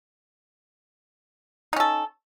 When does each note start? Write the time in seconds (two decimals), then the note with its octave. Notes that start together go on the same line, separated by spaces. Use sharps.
1.73 D#4
1.76 C#4
1.80 A4